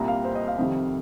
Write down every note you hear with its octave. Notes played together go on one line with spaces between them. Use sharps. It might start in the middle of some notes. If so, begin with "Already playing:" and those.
Already playing: C2 A#2 G3 A#5
F5
C5
D#5
F5
F2 C3 D#3 G3